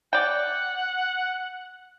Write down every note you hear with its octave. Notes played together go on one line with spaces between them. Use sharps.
D5 F#5 G5